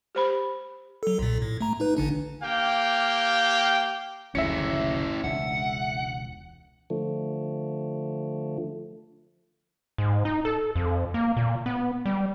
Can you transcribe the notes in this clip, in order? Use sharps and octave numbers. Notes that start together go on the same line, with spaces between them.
G4 C5 B5
F#3 A4
B1 A#2
A2
A3 A#5
D#4 B4
A1 D3 D4
A#3 G4 F5 G5
F#1 D2 C#3 C#4 E4 E5 C#7
E1 C#2 D4 F#5
D3 F3 A3
G#2
D#4
A4
F2
A#3
A#2
B3
G3